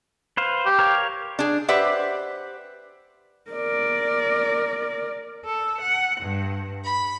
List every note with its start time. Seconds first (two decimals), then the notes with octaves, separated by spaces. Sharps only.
0.37 B4 C5 F5
0.66 G4
0.79 A#4 C#5 F5
1.39 D4 G#4
1.69 G4 B4 C5 D5 E5 F#5
3.51 A#4 D5
5.45 A4
5.82 F#5
6.21 G2
6.84 B5